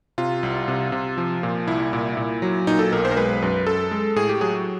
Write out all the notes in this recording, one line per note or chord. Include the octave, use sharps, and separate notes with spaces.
C3 F4
C2
C3
C3
F3
A#2
C2 E4
A#2
A#2
F#3
A#2 D#4
A4
B1 A#4
C5
A#4
G#3 B4
F#2
F#2 A4
G#3
A2 G#4
G4
F#3 G#4